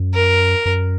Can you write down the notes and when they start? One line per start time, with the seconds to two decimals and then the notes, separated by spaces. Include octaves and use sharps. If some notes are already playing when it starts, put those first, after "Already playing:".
Already playing: F#2
0.14 A#4
0.65 F#2